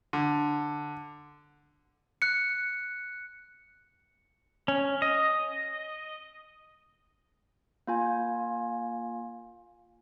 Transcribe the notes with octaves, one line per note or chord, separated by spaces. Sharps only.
D3
F#6 C#7
C#4
D#5
A#3 F4 G#5